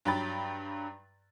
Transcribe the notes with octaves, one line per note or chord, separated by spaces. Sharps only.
G2 F#3 G5 B5 A6